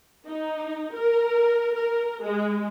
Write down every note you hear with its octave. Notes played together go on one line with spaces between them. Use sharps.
D#4
A#4
A#4
G#3